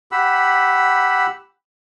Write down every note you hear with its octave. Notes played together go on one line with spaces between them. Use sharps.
G4 F#5 B5 E6